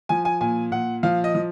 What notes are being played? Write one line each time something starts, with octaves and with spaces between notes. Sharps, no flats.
F3 G#5
G#5
A#2 G#5
A#2 F#5
F3 F5
D#5
F3